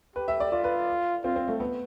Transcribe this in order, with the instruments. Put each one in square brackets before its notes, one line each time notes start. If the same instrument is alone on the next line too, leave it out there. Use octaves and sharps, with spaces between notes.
[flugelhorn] G4 [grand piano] B4
[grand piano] E5
D5
[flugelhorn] F4 [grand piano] D5
[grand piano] B4
[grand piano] C4 [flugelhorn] F4
[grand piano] C4
A3
B3